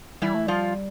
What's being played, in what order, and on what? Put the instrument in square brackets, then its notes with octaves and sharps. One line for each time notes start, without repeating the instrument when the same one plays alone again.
[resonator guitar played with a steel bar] E3 E4 [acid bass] G3
[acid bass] A3
[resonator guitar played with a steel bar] F3 F4 [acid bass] G3